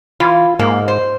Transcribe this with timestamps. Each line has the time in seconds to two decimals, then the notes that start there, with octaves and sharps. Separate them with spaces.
0.20 E3 F4
0.59 G#2 A#3
0.88 C5